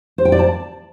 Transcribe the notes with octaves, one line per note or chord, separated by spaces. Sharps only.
C5
G5
D5
A5